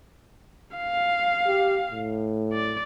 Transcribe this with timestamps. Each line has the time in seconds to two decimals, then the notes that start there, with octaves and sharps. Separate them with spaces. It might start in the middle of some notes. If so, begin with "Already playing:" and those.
0.77 F5
1.46 G4
1.92 A2
2.53 D5